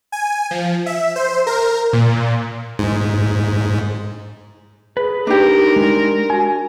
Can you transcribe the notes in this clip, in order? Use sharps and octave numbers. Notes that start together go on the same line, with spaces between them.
G#5
F3
E5
C5
A#4
A#2
G#2
G#4 B4
D4 D#4 G4 A#4
G#3
F#4 G#5